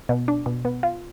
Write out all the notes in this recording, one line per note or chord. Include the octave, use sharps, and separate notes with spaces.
B2
D4
B2
B3
F4